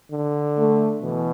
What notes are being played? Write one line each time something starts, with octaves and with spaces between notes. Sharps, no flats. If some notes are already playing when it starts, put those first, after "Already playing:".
D3
A3
B2 E3